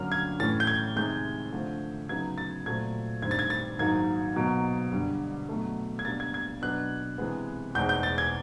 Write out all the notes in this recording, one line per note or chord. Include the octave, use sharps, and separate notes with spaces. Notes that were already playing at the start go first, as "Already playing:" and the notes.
Already playing: G2 D3 F#3 A#3 C#4 F6
G#6
A2 E3 A3 C#4 A6
G6
G#6
C3 D#3 G#3 G6
D3 F3 A3
C#3 F#3 B3 D#4 G#6
A6
A#2 F#3 A3 C4 G#6
G2 D#3 G3 C4 G#6
A6
G#6
A6
G#2 D#3 F#3 A#3 D#4 G#6
B2 F#3 A#3
G2 D3 G3
B2 F#3 A3
G#6
B2 G3 A#3 D4 A6
G#6
G#6
B2 F#3 B3 D4 F#6
C3 E3 G#3 B3
E2 B2 G#3 C4 D#4 G6
G6
A6
G#6